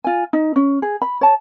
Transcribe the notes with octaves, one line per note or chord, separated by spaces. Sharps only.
F4 G#5
D#4
C#4
G#4
B5
C#5 A5